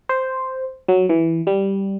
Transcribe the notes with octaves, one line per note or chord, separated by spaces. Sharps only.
C5
F#3
E3
G3